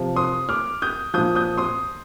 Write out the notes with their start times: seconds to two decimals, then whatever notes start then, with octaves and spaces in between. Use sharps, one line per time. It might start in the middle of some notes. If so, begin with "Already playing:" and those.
Already playing: C3 F3
0.16 C6 D#6
0.49 D6 F6
0.82 D#6 G6
1.14 A#2 F3 D#6 G6
1.35 D#6 G6
1.57 C6 D#6